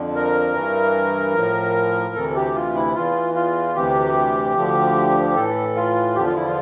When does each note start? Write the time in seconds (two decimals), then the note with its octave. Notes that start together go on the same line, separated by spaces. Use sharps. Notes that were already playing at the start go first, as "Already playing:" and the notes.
Already playing: F2 D3 F3
0.15 A#4
0.55 G2 E3
1.35 A2 F3
2.15 D2 C3 E3 A4
2.36 G4
2.55 F4
2.75 E4
2.95 E2 E3 F4
3.35 F4
3.75 D2 C3 E3 G4
4.56 D2 D3 F3
5.36 A2 E3 A4
5.76 F4
6.16 E2 D3 F3 G4
6.26 F4
6.36 E4
6.46 F4